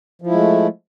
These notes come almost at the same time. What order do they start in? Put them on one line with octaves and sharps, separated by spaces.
F3 E4 G#3 A3